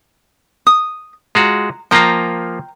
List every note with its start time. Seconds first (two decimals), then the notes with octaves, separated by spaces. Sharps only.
0.67 D#6
1.35 G#3 F4 F#4 A#5
1.91 F3 A#3 F4 G5 A#5